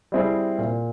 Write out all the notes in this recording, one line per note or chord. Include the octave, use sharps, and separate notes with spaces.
G3 C4 E4 G#4
A#2